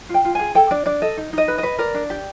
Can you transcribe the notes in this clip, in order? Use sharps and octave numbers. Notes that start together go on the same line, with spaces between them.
F4
G5
F4
G#4 G#5
A4 G5
D4 D5
D4 D5
A4 D#5
D#4
D#4 D#5
B4
B4 D#5
A#4 D5
D4
G4